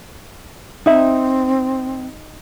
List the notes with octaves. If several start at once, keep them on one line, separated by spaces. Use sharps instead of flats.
C4 D#4 E5